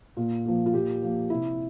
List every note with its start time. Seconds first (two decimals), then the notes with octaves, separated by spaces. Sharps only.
0.17 A#2
0.45 F3 A#3
0.66 F4
0.74 A#2 G4
1.02 F3 A#3
1.30 C3 E4